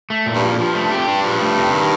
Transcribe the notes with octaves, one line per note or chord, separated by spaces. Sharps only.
A3
A#2
G2
F3
F2
G2 F3
A3
G4
F2
G2 D4
F3
A3
C3
D#3